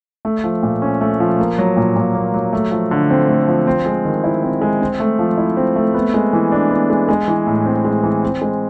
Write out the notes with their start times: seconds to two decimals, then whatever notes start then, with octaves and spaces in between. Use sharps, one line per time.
0.25 A3
0.44 F3
0.63 A#2
0.82 C#4
1.01 A3
1.20 F3
1.39 A#3
1.59 F#3
1.77 A#2
1.96 A#2
2.15 A#3
2.34 F#3
2.53 A3
2.72 F3
2.91 D3
3.10 C4
3.29 A3
3.48 F3
3.67 C4
3.86 G#3
4.05 D#3
4.24 E4
4.43 C4
4.62 G#3
4.81 C4
5.00 A3
5.19 F3
5.38 E4
5.57 C4
5.76 A3
5.94 B3
6.14 G#3
6.33 E3
6.52 D4
6.71 B3
6.90 G#3
7.09 G#3
7.28 E3
7.47 A2
7.66 C4
7.85 G#3
8.04 E3
8.23 C4
8.42 G#3